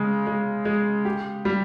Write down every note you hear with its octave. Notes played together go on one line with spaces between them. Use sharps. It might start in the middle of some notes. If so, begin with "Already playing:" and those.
Already playing: C#3 G#3
G#3
G#3
G4
G3